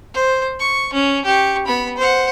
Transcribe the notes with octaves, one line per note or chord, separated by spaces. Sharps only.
C5
C#6
C#4
G4 C#6
B3 B5
C5 F#5